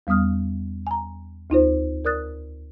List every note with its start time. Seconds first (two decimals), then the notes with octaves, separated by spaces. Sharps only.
0.07 E2 G3 B3 D#6 F6
0.87 G#5 A#5
1.50 D2 D#4 F4 C5
2.05 A#4 D5 D#6 F#6 A6